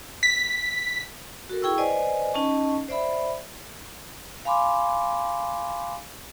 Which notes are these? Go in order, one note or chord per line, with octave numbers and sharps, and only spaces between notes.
B6
F#4 A4 A#4
E4 G#4 G5 C#6 E6
B4 C5 D5 D#5 G#5
C#4 D#4 D#5 A5 C#6
C5 D5 E5 B5
F5 G#5 B5 C6 D6